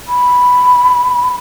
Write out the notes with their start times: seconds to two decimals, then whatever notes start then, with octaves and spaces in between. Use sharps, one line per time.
0.08 B5